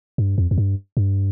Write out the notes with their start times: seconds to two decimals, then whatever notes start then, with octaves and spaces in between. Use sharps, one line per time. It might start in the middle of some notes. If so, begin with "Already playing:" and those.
0.18 G2
0.38 F2
0.51 F2
0.58 G2
0.97 G2